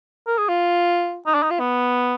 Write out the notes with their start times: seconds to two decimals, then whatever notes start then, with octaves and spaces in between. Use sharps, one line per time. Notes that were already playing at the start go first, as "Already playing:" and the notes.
0.27 A#4
0.38 G#4
0.49 F4
1.27 D#4
1.34 D4
1.43 D#4
1.50 F4
1.59 B3